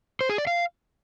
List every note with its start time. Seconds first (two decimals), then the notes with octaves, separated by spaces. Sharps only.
0.21 C5
0.29 G#4
0.38 D5
0.47 F5